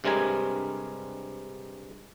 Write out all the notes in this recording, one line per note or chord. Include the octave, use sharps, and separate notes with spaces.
G2 C3 G3 G#3 A#4 G#5